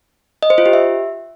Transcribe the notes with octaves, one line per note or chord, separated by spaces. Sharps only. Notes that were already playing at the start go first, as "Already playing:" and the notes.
D#5
C5
F4
G4
E5